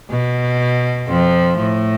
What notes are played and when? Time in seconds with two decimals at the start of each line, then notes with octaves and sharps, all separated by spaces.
0.11 B2
1.08 F2 F3
1.58 A2